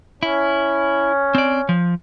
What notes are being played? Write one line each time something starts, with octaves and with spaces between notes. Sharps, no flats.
C#4 E4
C4 D5
F3